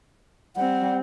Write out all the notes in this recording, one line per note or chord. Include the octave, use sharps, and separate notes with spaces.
G3 C4 F#5